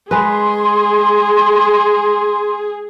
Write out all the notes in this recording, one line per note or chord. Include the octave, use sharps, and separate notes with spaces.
G#3 G#4 B4 C6